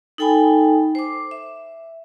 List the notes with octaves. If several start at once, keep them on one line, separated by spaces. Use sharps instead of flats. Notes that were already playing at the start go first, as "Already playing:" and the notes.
D#4 A4 G5 G#5 B5
C5 D6
E5